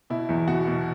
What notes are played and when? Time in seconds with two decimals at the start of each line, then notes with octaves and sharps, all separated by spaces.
0.10 B2 E4
0.29 E2
0.48 B2 F#4
0.67 B2